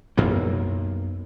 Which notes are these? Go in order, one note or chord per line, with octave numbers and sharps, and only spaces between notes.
B1 F#2 A#3